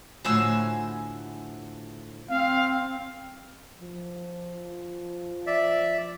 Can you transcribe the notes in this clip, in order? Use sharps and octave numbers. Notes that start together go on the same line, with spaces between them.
A2 D3 F3 F#4 G#5 E6
C4 F5
F3
D5 E5